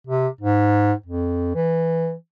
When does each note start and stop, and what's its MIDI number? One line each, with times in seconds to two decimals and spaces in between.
0.07 0.28 48
0.41 0.93 44
1.06 1.52 41
1.55 2.14 52